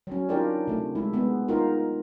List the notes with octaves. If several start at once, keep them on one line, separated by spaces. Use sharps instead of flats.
F#3 C#4
D4 D#4 F4 G4 A#4 D5
C3 A3
G#3 E4
G#3 B3
D#4 F4 A#4